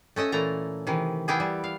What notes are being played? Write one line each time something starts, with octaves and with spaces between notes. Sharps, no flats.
A3 C#4 D#5 E5
A#2 E3 A3 A#5
C3 D#3 E3
B3 E4 G4 G#4
G3
F5